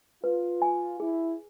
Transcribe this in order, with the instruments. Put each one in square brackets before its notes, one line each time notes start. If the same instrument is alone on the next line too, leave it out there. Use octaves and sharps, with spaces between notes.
[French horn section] F4 [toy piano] B4
[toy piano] G#5
[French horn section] E4 [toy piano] G#4